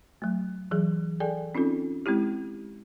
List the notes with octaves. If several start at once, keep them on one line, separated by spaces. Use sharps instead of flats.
F#3 A3
E3 F#3 G#4
G#4 A4 D5 G5 G#5
C4 C#4 D#4 F4 A4
G#3 C4 E4 G4